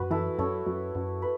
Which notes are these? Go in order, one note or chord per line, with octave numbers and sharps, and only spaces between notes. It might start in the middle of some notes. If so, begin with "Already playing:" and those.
Already playing: F#2 F#4 B4
E3 E4 A4
F#2 A4 C#5
F#2
F#2
B4